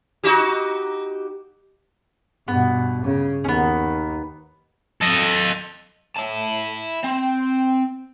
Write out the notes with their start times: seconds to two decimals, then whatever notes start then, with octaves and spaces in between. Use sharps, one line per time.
0.24 D#4 F#4 G4
2.48 G2 B2 B3
3.04 C#3
3.44 D#2 D#3 B3 C#4
5.01 A4 D#5
6.16 E4 A5
7.04 C4 G5